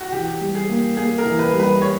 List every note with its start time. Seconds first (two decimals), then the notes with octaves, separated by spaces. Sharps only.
0.01 F#4
0.12 E3 G4
0.41 G3
0.55 G#4
0.69 A#3
0.97 A#3 G#4
1.18 A#4
1.25 E3
1.39 B4
1.53 G3
1.60 B4
1.82 G3 C#5